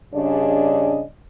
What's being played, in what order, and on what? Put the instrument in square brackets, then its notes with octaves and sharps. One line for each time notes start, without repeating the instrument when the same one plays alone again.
[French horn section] G2 C#3 D4 G#4 D5 D#5